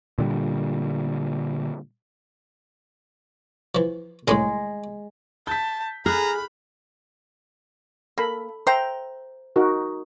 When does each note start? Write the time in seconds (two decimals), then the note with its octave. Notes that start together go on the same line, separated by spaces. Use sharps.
0.18 A#2 D3 G3
3.75 E3 F3
4.28 C2 A2 C#3 G#3
5.47 A5 G6 B6
6.06 G#4 A#5 B5 F6 F#6
8.18 A#3 A4 B5
8.67 C5 E5 G5 A#5
9.56 D#4 F#4 A#4